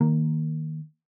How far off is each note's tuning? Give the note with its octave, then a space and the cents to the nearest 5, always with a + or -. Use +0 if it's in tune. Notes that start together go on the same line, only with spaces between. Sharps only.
D#3 +0 A#3 -5